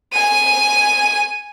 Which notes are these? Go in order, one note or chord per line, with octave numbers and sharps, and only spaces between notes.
G#5 D#7